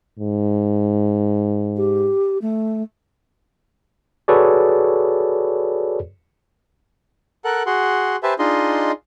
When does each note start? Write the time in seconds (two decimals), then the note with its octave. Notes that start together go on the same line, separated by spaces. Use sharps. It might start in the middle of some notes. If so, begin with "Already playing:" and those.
0.19 G#2
1.77 G4
2.42 A3
4.28 F#4 G#4 A4 B4 C#5 D5
7.45 A4 A#4 F#5 F#6
7.66 F#4 G#4 F#5 C6
8.23 G4 B4 C5 E5 G#5 A5
8.39 D4 D#4 F4 G#4 D#5 C6